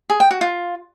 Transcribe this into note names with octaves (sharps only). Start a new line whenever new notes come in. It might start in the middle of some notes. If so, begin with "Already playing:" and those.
G#4
G5
F#4
F4